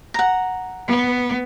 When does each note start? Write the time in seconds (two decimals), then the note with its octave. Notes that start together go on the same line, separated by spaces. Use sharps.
0.14 F#5 A#5
0.87 B3